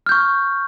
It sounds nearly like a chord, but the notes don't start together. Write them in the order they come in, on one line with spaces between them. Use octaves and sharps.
F6 G6 C#6